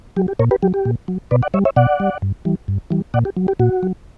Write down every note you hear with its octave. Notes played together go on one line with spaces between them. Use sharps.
F#3 G4
G4
A#2 A#4 C#5
G4 B4
F#3 G4
G4
A#2
F#3
B2 B4 D5
D5 F#5
G3 C#5 E5
C#5 E5
B2 D5 F#5
G3
G2
E3 G3
G2
E3 G3
A#2 D5 F#5
G4
F#3
G4
A#2 F#4
F#3